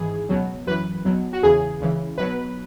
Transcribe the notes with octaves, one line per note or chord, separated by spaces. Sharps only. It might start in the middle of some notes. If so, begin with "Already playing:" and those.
Already playing: G#1 G#2 E3 G#4
C#2 B2 F#3
F#2 E3 B4
B1 B2 F#3
F#4
E2 C#3 E3 G#4
C#2 C#3 E3
B1 B2 F#3 B4